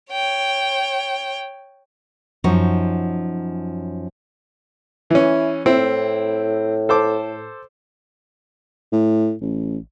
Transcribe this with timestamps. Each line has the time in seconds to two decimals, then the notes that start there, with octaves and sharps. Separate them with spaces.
0.12 C#5 G5
2.44 F#2 F3 D#4 F#4
5.11 E3 C#4 E4
5.66 A2 C4 E4
6.89 A4 C5 D6
8.93 A2
9.42 A1